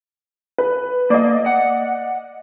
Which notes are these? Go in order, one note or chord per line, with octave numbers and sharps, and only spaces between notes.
B4
A#3 D5 D#5
F#5